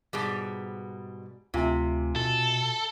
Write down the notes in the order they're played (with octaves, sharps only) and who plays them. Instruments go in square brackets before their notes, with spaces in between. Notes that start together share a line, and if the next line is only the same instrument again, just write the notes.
[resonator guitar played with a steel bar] G#2 B2 G3 [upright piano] G#4
[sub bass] D2 [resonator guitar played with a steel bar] C3 [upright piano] F4 E5 G#5
[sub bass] B2 [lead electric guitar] A4